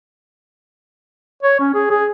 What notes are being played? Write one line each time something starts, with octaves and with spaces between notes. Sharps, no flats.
C#5
C#4
G#4
G#4